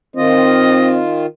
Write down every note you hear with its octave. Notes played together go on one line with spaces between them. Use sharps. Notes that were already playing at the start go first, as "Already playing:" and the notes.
D#3 C4 F4 D#5